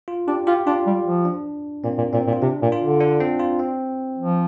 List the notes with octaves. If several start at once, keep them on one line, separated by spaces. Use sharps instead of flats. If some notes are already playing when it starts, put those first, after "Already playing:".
F4
D4 G4
F4 G4
D4 F4
G3
F3
D4
A#2 C4
A#2
A#2 C4
A#2
F4
C3 D4
A#2
F4
D3
D4
C4
F4
C4
F3